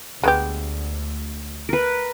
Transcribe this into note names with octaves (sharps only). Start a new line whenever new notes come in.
D2 G#3 B3 G4
A#4 B4